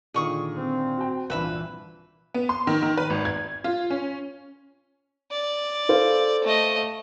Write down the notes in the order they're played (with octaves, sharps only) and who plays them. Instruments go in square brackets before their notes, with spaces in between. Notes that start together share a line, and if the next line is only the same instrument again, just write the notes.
[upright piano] A#2 D3 D#3 [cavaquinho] G#4 C#6 D#6
[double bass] C4
[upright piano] F#4 G5
[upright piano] C2 G2 A#2 [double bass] E3 [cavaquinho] B4 E5 B5
[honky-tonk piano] B3
C6
D#3
D#3
B4
G#1
G#6
F4
C#4
[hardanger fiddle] D5
[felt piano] A4 C5 F5
[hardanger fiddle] A3 D#5